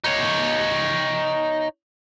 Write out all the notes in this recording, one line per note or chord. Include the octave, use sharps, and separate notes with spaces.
D#4 C#5